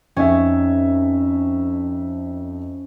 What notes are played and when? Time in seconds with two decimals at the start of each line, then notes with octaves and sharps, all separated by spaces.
0.16 F2 C#4 D#4 E5